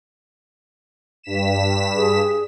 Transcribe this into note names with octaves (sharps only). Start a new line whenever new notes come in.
G2 B6 E7
G#4